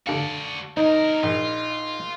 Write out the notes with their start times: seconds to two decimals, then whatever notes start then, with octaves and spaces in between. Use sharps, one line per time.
0.07 D3 F#4 D5 F5
0.77 D2 D#4 A#4
1.23 A#1 F4